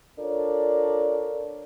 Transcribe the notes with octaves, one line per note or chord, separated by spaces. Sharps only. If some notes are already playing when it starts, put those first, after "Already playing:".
D4 F4 A4 A#4 C#5 D5